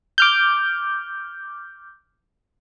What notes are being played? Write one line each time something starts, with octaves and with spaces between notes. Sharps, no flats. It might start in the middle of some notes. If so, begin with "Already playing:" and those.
D6 F6 G6